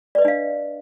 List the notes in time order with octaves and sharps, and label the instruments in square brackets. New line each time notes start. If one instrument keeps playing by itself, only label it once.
[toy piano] D5
B4
D#5
D4
F5